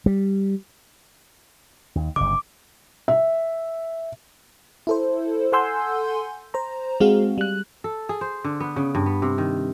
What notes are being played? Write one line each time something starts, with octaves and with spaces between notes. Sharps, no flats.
G3
D#2
G1 C#3 D6
E5
E4 A4 C5
A4 F#5 G#5 C6 E6 G6
C5 A#5
G#3 C4 F#4 G#4 F5
G3 F#6
A4
G#4
C5
D3
B3
C#3
G2
B3
C3
D#3